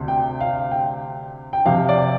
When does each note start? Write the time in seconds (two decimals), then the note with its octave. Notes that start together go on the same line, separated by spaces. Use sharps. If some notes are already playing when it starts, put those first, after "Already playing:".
Already playing: D2 C3
0.08 G5
0.40 F5
0.71 G5
1.53 G5
1.66 F2 C3 F5
1.89 D5